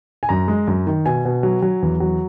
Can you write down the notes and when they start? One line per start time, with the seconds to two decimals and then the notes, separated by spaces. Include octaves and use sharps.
0.23 G#5
0.29 F#2 A#5
0.48 G#3
0.67 F#2
0.87 D#3
1.06 B2 G#5
1.25 B2
1.43 F#3
1.62 F#3
1.82 E2
2.00 F#3